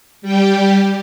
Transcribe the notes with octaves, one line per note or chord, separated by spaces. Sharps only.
G3 G4